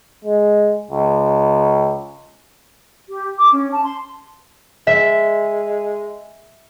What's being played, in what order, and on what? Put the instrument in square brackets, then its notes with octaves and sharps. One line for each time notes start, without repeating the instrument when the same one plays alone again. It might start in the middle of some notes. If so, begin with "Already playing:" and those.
[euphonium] G#3
C#2
[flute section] G4
D6
C#4
A5
C6
[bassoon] G#3 [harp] E5